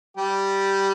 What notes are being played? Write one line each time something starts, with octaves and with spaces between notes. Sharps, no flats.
G3 G4